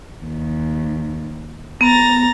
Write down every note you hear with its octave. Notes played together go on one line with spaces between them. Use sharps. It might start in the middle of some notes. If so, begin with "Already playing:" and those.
D#2
B3 A#5 A6 A#6